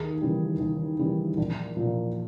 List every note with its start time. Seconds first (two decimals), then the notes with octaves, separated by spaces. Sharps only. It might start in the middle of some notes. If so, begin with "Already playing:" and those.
Already playing: D#2 G#4
0.21 C#3 E3 G3
0.60 D#2
0.99 C#3 E3 G3
1.37 A#1
1.77 A#2 F3